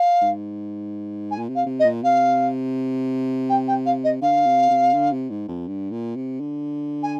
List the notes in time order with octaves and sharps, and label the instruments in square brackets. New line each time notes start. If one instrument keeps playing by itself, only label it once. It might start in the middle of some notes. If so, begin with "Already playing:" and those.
Already playing: [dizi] F5
[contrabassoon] G#2
[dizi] G#5
[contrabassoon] A#2
C3
[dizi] F5
[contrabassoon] C3
[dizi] D#5
[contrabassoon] A#2
[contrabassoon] C3 [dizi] F5
[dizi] G5
G5
F5
D#5
[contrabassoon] D3 [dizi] F5
[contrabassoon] C3
C3
D3
C3
G#2
F2
G2
A#2
C3
D3
[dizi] G#5